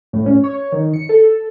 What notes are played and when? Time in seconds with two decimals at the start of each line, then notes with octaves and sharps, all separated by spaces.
0.13 A2
0.26 C#4
0.44 C#5
0.72 D#3
0.93 C#7
1.09 A4